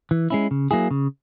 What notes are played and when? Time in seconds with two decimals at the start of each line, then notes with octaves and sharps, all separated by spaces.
0.11 E3
0.30 G#3 C#4 E4
0.51 C#3
0.71 F#3 A#3 E4 G#4
0.91 C#3